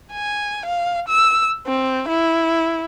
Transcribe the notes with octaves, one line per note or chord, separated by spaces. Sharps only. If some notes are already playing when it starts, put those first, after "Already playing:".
G#5
F5
E6
C4
E4